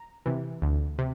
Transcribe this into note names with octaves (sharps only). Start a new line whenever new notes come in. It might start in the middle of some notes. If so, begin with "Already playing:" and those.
Already playing: A#5
C3 E3
D2
C3